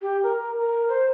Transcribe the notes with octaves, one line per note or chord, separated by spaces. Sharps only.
G4
A#4
A#4
C5